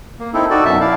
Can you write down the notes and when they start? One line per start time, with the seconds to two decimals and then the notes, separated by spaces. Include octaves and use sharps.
0.20 A#3
0.34 C4 D#4 E4 A4
0.50 D#4 F#4 A4 D5
0.65 F#2 B2 E5 A5
0.81 E4 D5 F5